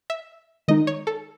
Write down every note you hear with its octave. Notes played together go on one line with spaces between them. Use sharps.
E5
D#3 G#3 D#4 D#5
C#5
A4